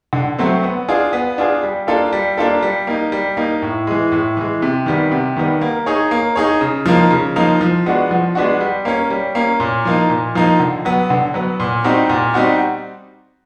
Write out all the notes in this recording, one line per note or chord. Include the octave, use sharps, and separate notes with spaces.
D3
F#3 A3 C4
B3
D4 F4 G#4
B3
D4 F4 G#4
G3
A#3 D4 F4 A4
G3
A#3 D4 F4 A4
G3
A#3 D#4
G3
A#3 D#4
A2
E3 G#3
A2
E3 G#3
C3
D#3 G3 B3
C3
D#3 G3 B3
A#3
D#4 G#4 C#5
A#3
D#4 G#4 C#5
C#3
F3 A#3 D#4
C#3
F3 A#3 D#4
F3
G#3 B3 D4 F#4
F3
G#3 B3 D4 F#4
G3
A#3 C#4
G3
A#3 C#4
A#2
F3 A#3 D#4
A#2
F3 A#3 D#4
D3
F#3 B3
D3
F#3 B3
A#2
G3 C4 D#4 F#4
A#2
G3 C4 D#4 F#4